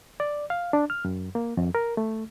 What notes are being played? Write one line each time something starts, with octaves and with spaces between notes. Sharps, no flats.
D5
F5
D4
F6
F#2
A#3
F2
A#4
A3